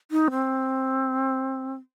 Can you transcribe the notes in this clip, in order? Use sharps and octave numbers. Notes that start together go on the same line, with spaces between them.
D#4
C4